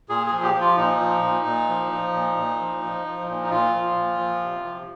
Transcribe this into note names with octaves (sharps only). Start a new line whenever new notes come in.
A#2 G#4
G#4
F3
G4
F3
F4
A#2 D#4
F3
A#2
A#2
F3
F3
A#2
A#2
F3
F3
F3
A#2
D#4
A#2 F4
F3
A#2
F3
C3
F3